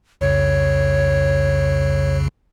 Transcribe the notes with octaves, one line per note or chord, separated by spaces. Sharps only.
C2 F2 C#3 C#5